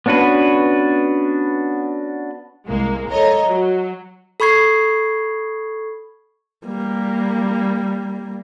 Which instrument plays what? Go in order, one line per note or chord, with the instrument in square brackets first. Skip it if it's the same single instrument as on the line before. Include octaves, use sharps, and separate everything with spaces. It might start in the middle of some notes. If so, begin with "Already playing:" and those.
[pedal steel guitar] B3 C#4 D4 F#4 B4
[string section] C2 G#3 A#3
A4 C#5 D#5 A#5
F#3
[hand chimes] A4 B5 C#6 G#6 C7
[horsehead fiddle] G3 A#3